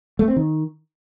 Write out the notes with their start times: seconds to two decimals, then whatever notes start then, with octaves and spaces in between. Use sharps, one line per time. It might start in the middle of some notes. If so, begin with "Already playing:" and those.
0.19 A3
0.28 C4
0.36 D#3